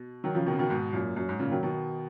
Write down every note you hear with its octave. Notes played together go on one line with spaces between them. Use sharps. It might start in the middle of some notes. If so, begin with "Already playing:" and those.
Already playing: B2
D#3 F#3
C#3 F3
B2 D#3
C#3
B2 D#3
G#2 B2
F#2 A#2
F#2
G#2
A#2 C#3
D#3 F#3
B2 D#3